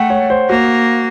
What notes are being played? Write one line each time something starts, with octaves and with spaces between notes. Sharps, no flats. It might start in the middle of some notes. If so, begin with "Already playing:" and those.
Already playing: A3 F#5 G5
C#5
C5
A#3 F#4